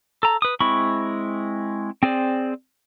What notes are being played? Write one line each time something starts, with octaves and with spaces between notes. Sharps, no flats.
A4 A#5
B4 D#6
G#3 C4 E4 B5 C#6
C4 G#4 C5 D5